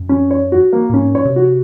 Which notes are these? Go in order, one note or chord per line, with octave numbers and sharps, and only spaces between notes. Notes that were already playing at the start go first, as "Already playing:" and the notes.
Already playing: F#2
C#4
C#5
F#4
A#3
A#2
G#2 C#4
C#5
C3
F#4